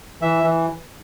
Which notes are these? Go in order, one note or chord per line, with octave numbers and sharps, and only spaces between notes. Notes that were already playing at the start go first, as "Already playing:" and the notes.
E3 E5
E3